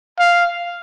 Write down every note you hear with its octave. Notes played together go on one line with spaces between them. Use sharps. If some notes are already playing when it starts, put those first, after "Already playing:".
F5